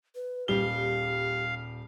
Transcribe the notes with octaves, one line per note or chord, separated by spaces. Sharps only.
B4
D#1 G3 G4 F5 G7